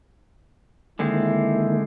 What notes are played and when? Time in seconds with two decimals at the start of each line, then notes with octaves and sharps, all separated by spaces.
0.99 D3 D#3 G#3 A#3 C4 E4